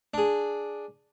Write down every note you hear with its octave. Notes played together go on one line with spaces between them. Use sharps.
D4 G#4